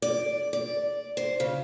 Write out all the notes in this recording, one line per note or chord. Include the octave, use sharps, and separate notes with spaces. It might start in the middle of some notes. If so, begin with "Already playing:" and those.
D5
D5
C5
C#3